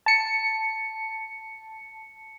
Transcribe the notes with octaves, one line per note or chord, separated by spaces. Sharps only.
A5 C#7